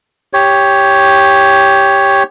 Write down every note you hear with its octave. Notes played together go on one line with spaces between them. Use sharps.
G4 C#5